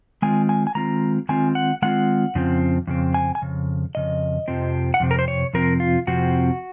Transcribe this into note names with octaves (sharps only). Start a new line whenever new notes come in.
D#3 G#3 C4 F4 G#5
G#5
G#5
D#3 G#3 C4 F4 A#5
D#3 G#3 C4 F4 G#5
F#5
D#3 G#3 C4 F4 F#5
F2 C#3 F3 C4
F2 C#3 C4
G#5
G#5
F2 C#3
F2 C#3 D#5
F2 C3 F3 C4
F#5
F2 C3 C4
A#4
C5
C#5
F2 C3 F3 C4 A#4
F4
F2 C3 F3 C4 F#4